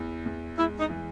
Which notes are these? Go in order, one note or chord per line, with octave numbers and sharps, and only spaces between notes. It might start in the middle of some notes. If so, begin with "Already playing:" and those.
Already playing: E2 E4
E2
G#3 E4
D#4
E3